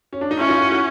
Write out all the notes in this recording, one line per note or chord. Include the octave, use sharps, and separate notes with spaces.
C#4
D4
D#4
C#4 E4
D#4 F4
E4 F#4
E4 F#4